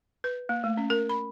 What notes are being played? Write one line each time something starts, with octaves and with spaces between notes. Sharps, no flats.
B4
A#3
A3
C#4
A#4
B5